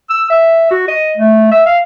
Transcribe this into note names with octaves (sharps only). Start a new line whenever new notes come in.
E6
E5
F#4
D#5
A3
E5
F5